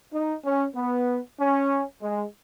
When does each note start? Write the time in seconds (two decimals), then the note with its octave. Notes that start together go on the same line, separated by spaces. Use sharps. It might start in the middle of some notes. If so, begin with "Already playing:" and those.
0.13 D#4
0.45 C#4
0.75 B3
1.40 C#4
2.02 G#3